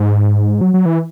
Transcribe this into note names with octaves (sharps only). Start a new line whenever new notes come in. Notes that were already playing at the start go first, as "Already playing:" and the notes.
Already playing: G#2
F#3
F#3
E3